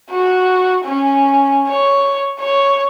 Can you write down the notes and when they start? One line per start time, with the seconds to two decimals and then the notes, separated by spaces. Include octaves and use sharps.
0.11 F#4
0.85 C#4
1.68 C#5
2.40 C#5